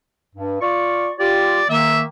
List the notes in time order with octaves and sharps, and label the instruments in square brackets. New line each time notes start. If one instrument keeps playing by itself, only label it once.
[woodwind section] G2
F4 D5 C#6
[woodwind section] F4 G4 [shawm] D5
[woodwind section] D#3 A#3 [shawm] E5